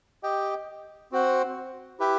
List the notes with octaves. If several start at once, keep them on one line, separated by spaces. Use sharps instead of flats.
G4 D#5 G5
C4 F#4 C5 F#5
E4 G4 B4 E5 G5